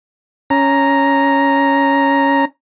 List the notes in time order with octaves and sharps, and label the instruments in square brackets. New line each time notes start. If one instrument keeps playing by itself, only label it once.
[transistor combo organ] C#4 A#5